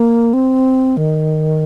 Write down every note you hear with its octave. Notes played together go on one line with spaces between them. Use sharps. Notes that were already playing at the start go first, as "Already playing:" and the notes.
Already playing: A#3
C4
D#3